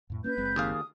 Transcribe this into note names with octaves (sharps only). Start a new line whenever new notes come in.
F2 A2
A#3 B3 C#4 B4 G6
F#1 G#3 C4
D#2 G#4 F5
D#6